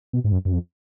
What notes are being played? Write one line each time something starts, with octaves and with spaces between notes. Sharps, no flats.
B2
G#2
F#2
F#2
F2